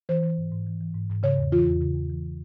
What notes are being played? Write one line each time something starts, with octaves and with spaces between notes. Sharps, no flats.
E3 C5
E3
G#2
G#2
E3
E3
G#2
G#2
C#3 C#5
E2
E3 F4
E2
C#3
E2
E3